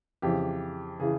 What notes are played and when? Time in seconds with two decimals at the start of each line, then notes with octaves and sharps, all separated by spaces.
0.22 F2 C#3 E3 G4
1.00 C#3 E3 G#4